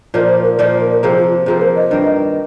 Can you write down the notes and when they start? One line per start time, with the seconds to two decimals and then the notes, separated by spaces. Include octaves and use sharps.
0.14 A#2 F3 A#3 D#4 A#4
0.24 D5
0.29 C5
0.44 A#4
0.59 A#2 F3 A#3 D#4 D5
0.69 D5
0.81 A#4
0.92 A#4
1.03 C3 F3 A#3 G#4
1.17 F4
1.32 G4
1.46 C3 F3 A#3 G#4
1.57 C5
1.61 A#4
1.76 D#5
1.91 G2 D#3 A#3